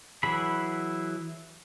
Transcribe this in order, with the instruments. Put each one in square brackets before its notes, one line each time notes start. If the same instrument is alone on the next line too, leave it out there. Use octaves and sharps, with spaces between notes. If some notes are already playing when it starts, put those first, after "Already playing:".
[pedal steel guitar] E3 F#3 E4 G#4 B5